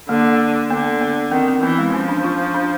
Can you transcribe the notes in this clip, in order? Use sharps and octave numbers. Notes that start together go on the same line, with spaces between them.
D3 A#3
D3 B3
B3
D#3 C4
C4
E3 B3
G#3
F3 C#4
D4
F4
D4